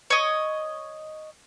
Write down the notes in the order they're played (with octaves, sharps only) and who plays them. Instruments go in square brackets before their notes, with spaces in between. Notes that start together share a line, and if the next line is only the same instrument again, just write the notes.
[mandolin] C#5 D#5